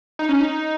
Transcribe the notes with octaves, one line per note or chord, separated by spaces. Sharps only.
D#4
C#4
D#4